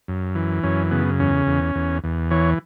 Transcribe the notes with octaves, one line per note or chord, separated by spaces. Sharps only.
F#2
E3
F#2 C#4
C#3 B3
E2 C#4
E2
E2
E2
E3 C#5